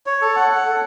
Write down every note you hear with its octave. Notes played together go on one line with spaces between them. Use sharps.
C#5
A4
F#5
F#5
A4